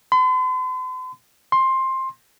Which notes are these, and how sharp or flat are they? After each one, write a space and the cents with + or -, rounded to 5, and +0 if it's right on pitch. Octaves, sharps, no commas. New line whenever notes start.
C6 -45
C6 +15